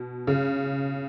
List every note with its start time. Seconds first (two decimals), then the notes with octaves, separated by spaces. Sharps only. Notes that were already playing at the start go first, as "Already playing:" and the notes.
Already playing: B2
0.27 C#3